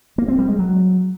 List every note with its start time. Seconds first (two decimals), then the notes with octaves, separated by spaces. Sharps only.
0.18 A#3
0.28 C4
0.38 G3
0.49 G#3
0.59 F#3